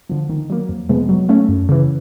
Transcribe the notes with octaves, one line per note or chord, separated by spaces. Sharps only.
D3 F3
D#3
F#3 A#3
F2
C3 F3 G#3 B3
F#3
A3 C#4
F#2
C#3 E3